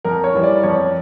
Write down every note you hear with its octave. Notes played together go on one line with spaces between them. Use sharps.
F2 A#4
C#5
E3 G3
D5
F2 C#5